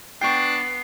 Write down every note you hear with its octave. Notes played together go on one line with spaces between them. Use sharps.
B3 D4 G5 C#6 C7